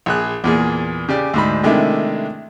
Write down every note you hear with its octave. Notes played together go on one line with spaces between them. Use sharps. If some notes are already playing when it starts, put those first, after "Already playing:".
A#1 G#4 F#6
E2 A#2 G#4
C#3 G4 D5
D2 G#2 B5
C3 D#3 G#3 A3 D4 E4